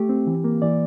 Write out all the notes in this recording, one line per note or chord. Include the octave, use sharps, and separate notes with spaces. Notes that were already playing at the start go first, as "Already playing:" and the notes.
Already playing: A3 G4
C4
E3
A#3
E3 D5